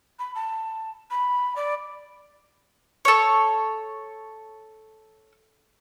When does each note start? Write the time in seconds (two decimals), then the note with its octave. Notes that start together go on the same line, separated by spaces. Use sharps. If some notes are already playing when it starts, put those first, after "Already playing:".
0.19 B5
0.35 A5
1.10 B5
1.56 D5
3.05 A4 C#5